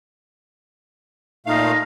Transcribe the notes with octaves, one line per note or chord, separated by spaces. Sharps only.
A#2 A3 D#4 F5